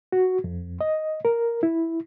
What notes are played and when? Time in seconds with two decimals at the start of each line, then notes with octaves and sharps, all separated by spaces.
0.12 F#4
0.44 F2
0.81 D#5
1.25 A#4
1.63 E4